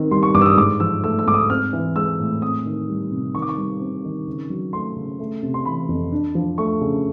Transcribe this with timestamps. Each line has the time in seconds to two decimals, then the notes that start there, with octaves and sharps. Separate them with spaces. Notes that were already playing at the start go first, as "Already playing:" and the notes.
Already playing: D#3 C4
0.11 G3 C6
0.23 C#6
0.34 G2 D6
0.42 E6
0.46 D#6
0.57 G#2 D6
0.80 F3 E6
1.04 A3 E6
1.19 E6
1.27 G#2 D6
1.34 D#6
1.50 C4 F6
1.73 E3
1.96 G#3 E6
2.19 A2
2.42 C4 D#6
2.66 D#3
2.89 G3
3.11 C3
3.35 D#3 C#6
3.42 D6
3.49 C#6
3.58 G3
3.81 C4
4.04 D#3
4.27 C#3
4.50 F#3
4.73 A3 C6
4.96 C#3
5.19 A3
5.43 C3
5.54 C6
5.65 E3 B5
5.89 F2
6.12 D4
6.35 F3
6.58 A3 C#6
6.81 C#3